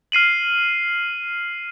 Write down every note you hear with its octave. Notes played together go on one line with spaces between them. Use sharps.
F6 C7 D#7 F#7